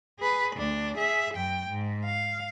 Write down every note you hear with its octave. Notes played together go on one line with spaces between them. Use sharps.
G#4 B4
D2 D4
G#4 E5
F#2 G5
G#2
F5